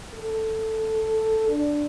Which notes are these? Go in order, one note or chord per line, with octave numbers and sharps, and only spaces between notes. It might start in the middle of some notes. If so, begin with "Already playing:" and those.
A4
D4